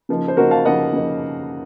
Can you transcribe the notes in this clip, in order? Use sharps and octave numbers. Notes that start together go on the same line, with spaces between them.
C#3 F3 A#3 D#4
C5
C#3 F3 A#3 D#4 F#4 A#4
F5 A5
C#3 F3 A#3 D#4 D#5 F#5
C#3 F3 A#3 D#4